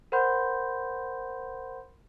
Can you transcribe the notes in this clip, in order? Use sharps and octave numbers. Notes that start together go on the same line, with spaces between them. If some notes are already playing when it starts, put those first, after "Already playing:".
A#4 C5 F#5 B5 C6 G6